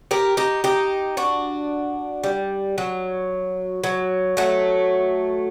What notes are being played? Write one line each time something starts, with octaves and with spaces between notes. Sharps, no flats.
G4 A#4
D#4 G4
D#4 G4
D4 F#4
G3
F#3
F#3
F#3 A3